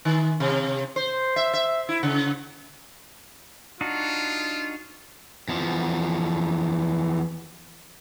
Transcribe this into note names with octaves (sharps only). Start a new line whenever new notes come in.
D#3
C3
C5
E5
E5
E4
C#3
D4 D#4 F4 F#4
E2 F3